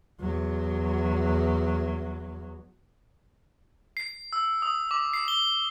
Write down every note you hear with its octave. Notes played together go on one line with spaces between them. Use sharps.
E2 F#3
C7
E6
D#6
D6
C7
G7